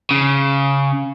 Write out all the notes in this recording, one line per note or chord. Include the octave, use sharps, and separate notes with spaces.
C#3